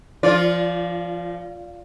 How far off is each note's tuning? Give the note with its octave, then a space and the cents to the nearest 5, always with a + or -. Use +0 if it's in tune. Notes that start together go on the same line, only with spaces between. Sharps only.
F3 -30 F4 +0 D5 -15